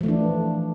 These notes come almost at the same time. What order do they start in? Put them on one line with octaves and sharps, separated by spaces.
F3 A3 E3 D4